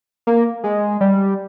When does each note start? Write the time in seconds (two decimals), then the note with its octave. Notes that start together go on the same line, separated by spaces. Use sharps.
0.27 A#3
0.64 G#3
1.01 G3